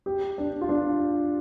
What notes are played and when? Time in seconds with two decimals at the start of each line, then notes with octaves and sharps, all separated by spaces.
0.06 G4
0.38 D4
0.61 F4
0.69 D4